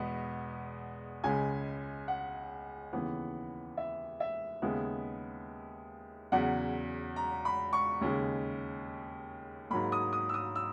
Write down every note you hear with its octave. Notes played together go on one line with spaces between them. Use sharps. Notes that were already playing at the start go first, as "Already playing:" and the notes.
Already playing: E2 B2 G#3 B3
C#2 C#3 G#3 G#5
F#5
D#2 C#3 E3 B3
E5
E5
D#2 C#3 G#3 B3
E2 C#3 F#3 F#5
A#5
B5
C#6
D#2 C#3 G#3
G#2 F#3 A#3 B5
D#6
D#6
E6
D#6
E6